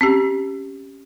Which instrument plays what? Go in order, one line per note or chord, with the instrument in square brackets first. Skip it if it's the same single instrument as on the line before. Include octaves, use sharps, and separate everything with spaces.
[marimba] C4 C#4 G4